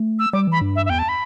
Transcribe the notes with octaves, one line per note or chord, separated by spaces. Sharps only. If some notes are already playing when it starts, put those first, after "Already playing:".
Already playing: A3
E6
G3 D6
E3 B5
G2
E5
E5
E2 G5
A5
B5